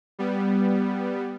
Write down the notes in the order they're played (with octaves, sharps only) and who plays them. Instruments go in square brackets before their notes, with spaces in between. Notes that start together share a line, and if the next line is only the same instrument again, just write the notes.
[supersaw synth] G3 B3